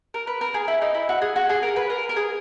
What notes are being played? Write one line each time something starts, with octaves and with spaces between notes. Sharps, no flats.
A#4
B4
A#4
G#4
E4
D#4
E4
F#4
G#4
F#4
G#4
A#4
B4
A#4
A#4
G#4